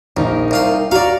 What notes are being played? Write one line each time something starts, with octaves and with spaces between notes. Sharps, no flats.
A#1 D#4 A#4
C2 F4 C6
F#4 D5 F5 A#5